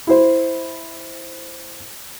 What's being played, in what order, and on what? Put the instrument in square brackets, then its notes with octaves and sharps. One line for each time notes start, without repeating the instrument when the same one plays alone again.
[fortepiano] E4 C5